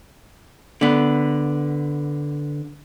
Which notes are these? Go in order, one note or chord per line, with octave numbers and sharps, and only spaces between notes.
D3 B3